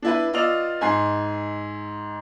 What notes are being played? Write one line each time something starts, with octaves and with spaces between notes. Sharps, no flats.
D4 E4 B4
B3 F4 D5 D#5 E6 F7
G#2 G#5 C6 C7